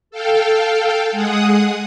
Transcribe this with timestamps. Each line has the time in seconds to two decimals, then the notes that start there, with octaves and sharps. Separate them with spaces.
0.11 A4 F5 G5
1.11 G#3 G#4 F#5 D#6